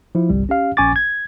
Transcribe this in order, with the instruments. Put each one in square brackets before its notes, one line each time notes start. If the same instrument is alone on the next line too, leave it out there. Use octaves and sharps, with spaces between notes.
[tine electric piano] F3 E4
G1 C2 G3
C#4 G4 F5
A#1 C#4 G#5 C#6 D6 A6
G#6